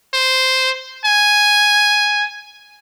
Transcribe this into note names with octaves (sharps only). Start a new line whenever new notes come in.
C5
G#5